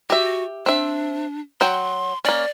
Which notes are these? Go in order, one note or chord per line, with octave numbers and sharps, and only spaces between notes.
F#4 G4 E5
C4 D4 E5
F#3 F#4 G5 C6
A#3 C#4 D5